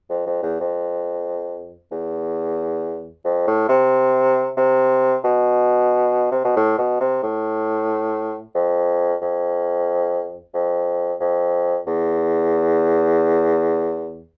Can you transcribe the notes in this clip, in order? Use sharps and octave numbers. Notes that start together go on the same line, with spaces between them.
F2
F2
E2
F2
E2
F2
A2
C3
C3
B2
C3
B2
A2
B2
C3
A2
F2
F2
F2
F2
E2